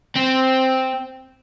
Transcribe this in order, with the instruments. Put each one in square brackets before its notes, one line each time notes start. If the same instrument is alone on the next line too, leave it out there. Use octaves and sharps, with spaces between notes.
[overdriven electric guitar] C4